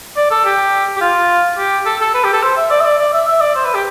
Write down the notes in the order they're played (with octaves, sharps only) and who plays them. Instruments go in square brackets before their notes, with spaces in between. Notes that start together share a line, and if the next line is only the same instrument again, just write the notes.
[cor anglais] D5
A4
G4
G4
F4
G4
A4
A4
B4
G4
A4
C5
E5
D5
E5
D5
D5
E5
E5
D5
C5
B4
G4